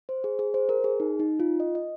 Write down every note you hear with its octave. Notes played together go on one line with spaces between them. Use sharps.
C5
G#4
G#4
C5
A#4
G#4
D#4
D#4
F4
D#5
D#5